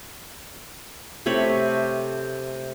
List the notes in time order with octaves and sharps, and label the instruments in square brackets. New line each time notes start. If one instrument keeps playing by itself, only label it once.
[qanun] C3 A3 C#5 B5